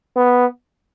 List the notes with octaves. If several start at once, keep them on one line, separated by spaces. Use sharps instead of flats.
B3